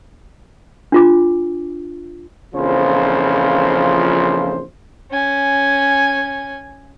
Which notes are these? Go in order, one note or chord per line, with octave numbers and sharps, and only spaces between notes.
D4 F4 D6
A#1 F2 C#3 E3 F3 C5
C#4 G#5